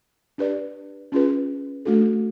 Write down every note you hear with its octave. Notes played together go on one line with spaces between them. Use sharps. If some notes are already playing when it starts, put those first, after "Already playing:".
D4 G4 B4 D5
C#4 F4 G#4 B4
A3 D4 F#4 A4